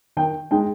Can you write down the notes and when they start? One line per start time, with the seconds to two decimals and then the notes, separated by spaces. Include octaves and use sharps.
0.17 D#3 G5
0.51 G#3 D#4 G5